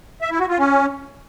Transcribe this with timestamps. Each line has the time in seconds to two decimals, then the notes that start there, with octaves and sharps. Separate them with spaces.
0.22 E5
0.31 E4
0.40 F#4
0.49 F4
0.58 C#4